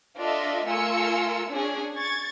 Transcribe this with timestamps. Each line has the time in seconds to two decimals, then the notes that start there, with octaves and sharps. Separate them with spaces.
0.17 D4 F4 A4 D#5 E5
0.66 A3 F4 A#4 G#5 E6 C#7
1.49 C#4 D4 G#4
1.96 C#6 G#6 A6